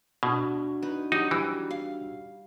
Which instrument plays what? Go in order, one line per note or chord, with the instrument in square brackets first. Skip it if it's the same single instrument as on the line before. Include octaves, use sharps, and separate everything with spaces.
[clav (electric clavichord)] B2 [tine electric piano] D4 F#4 G#6
[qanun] D#4 B4
[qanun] F#3 G4 [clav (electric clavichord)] D#4
[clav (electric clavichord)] E3 [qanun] G3
[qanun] F5